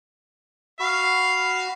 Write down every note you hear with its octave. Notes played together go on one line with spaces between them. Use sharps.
F#4 F5 B5 C#6